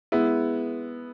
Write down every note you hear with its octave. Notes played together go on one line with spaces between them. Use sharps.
G#3 B3 E4